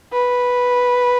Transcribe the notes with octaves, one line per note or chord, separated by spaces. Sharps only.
B4